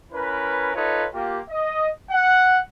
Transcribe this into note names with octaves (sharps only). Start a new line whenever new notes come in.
C#4 E4 A#4 B4
D#4 F4 A4 B4 C#5
A#3 F4 G4
D#5
F#5